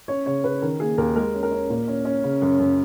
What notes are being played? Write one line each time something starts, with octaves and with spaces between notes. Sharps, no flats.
C#4 C#5
C#3 C#5
C#3 B4
D#3 A#4
A#3 G#4
D#2 A#4
G#3 A#4
C#4
A#4
C#4
A#2
C#4
C#4
C#3
F#2
F#2